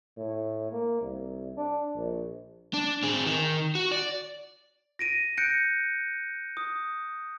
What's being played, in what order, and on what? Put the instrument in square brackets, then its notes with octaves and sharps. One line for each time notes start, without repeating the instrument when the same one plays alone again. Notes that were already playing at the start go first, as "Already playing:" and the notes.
[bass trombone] A2
A#3
C2
D4
A#1
[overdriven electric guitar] D4
C4 G#4
D#3
F#4
D5
[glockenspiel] A#6 D7 D#7
F#6 G6 A#6 C#7 D7
D#6